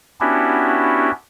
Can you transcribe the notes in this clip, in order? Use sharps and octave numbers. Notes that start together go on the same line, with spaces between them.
B3 C#4 D4 E4 F#4 G4